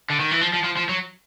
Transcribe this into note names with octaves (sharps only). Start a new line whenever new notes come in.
D3
D#3
E3
F3
F3
F3
F3
F#3